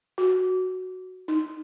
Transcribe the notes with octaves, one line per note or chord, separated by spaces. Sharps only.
F#4
D#4